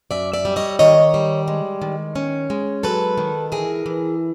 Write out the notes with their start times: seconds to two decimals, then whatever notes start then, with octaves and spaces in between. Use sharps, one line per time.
0.11 F#2 D5 E5
0.33 D5 E5
0.45 G3
0.56 C#5 D#5
0.79 D#3 C#5 D#5
1.14 G3
1.48 G#3
1.82 D#3
2.16 C#4
2.50 G#3
2.83 F#3 A4 B4
3.18 D#3
3.52 E3 G#4 A#4
3.86 E3